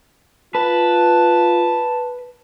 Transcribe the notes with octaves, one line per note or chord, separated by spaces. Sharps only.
F4 B4 A5